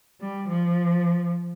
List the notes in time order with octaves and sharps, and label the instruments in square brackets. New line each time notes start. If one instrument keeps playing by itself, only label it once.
[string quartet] G3
F3